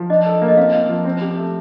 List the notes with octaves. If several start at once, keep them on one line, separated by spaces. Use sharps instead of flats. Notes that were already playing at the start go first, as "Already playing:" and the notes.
Already playing: F3
D4 D#5
A4
A#3
D#5
C4 F5
F4
F3
C4
G4
A3